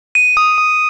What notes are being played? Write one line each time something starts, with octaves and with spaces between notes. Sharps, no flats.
D#7
D#6
D#6